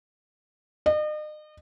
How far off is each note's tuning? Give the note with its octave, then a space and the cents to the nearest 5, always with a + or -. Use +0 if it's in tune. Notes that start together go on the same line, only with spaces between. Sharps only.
D#5 -40